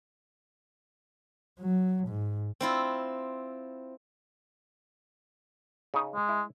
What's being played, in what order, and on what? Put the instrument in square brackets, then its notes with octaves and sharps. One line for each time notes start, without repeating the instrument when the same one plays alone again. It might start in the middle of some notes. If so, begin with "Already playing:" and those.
[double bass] F#3
G#2
[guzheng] C4 E4 F4
[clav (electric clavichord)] C#3 D#4
[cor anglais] G#3
[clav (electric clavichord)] E4